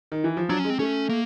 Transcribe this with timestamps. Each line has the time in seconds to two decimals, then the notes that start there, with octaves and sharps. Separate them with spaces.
0.12 D#3
0.24 E3
0.37 F3
0.49 F#3 D4
0.60 C#4
0.65 G#3
0.70 C4
0.79 A3 C#4
1.09 A#3